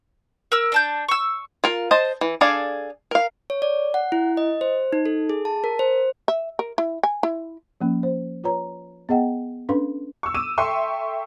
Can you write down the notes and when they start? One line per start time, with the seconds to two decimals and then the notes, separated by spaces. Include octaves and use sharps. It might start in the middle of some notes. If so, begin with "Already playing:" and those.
0.52 A#4 E6
0.72 D4 A5 G6
1.08 C#6 E6
1.64 F4 A#4
1.91 C5 D#5 A5
2.21 E3
2.41 D4 G#4 A4 D5 F5
3.11 A#4 F5
3.50 C#5
3.62 D5
3.94 F#5
4.12 E4
4.37 D#5
4.61 C5
4.93 D#4
5.06 A4
5.29 G#4
5.45 A5
5.64 A#4
5.79 C5
6.28 E5
6.59 A#4
6.78 E4
7.03 G#5
7.23 E4
7.81 F3 A#3 C#4
8.03 C5
8.44 F4 B4 C#5 A#5
9.09 B3 G#4 D#5 F#5 G5
9.69 C#4 D4 A4 B4 F5 C6
10.23 C#6 E6
10.34 D6 E6 D#7 E7
10.58 A4 E5 G5 C6 C#6